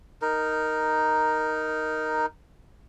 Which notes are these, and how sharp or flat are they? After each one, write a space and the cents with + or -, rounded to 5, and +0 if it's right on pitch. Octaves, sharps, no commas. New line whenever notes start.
D#4 +0 A#4 +0